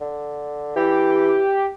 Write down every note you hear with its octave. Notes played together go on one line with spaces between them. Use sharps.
D3
E3 G4